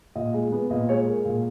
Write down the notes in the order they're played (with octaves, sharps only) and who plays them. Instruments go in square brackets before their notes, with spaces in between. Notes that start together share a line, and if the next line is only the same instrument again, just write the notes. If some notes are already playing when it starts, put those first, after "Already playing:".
[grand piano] A#2 D#5
G#3
B3
A#2 D#5
G#3 C#5
G#3 A#4
A#2